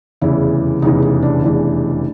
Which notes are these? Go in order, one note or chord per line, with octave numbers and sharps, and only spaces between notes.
F1 E2 C#3 E3 E4
F1 E2 C#3 E3 D#4
D#4
D4
F1 E2 C#3 E3